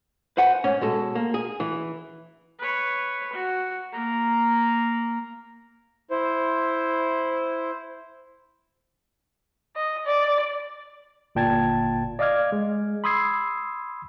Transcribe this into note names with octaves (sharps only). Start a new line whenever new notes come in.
B4 C5 F#5 G#5
G#2 C#4
B2 G#3 A4
A#3
G#4
E3
B4 C#5
F#4
A#3 A#5
E4 C5
D#5
D5
G1 A#2 G5 A5 G#6 A6
D5 D#5 F5 D6 F6 G#6
G#3
B5 C6 D#6 E6 G#6 C7